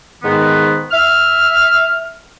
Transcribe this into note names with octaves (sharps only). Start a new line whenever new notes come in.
G#2 D#3 B3
E5 F6